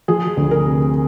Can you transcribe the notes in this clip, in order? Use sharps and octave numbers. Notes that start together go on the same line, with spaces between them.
F3 G#4
D2
A#4
C3